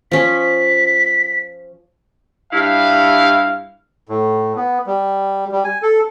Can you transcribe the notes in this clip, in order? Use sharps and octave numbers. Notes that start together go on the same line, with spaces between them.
F3 C#4 B6
G2 E4 F5
A2
B3
G3
G3
G#5
A4